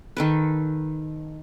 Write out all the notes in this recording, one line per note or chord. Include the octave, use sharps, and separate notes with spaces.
D#3 A4 B4